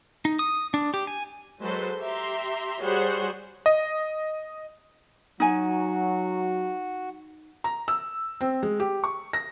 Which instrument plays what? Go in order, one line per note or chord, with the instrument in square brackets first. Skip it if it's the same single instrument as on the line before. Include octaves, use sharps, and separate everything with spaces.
[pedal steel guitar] D#4
D#6
D4
G4
G#5
[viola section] F#3 G#3 A4 B4 C5
G4 E5 A#5 C6
G3 F#4 G#4 C5 C#5 F#5
[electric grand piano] D#5
[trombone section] F#3 [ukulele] D#4 G#5 [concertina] F#4
[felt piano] A#5
E6
C4
G#3
G4
C#6
A#6